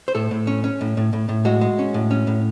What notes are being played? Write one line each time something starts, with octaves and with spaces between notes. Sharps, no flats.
C5
A2 A4
A2
C#4
C#4
A2
A2
A2
A2
G#3 F#4
G#3
C#4
A2
C#4
A2